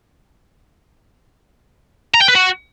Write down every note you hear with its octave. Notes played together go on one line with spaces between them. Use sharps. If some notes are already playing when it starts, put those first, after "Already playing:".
A#5
G5
B4
F#4